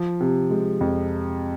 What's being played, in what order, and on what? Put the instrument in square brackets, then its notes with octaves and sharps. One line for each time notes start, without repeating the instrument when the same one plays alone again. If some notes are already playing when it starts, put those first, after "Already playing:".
Already playing: [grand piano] F3
C3
G#3
F2